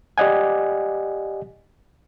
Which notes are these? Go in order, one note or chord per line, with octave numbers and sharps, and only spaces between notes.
G4 D5 D#5 F#5 G#5